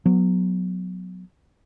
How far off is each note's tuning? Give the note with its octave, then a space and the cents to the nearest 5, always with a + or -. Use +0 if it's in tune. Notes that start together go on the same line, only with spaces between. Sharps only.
F#3 -15 B3 +0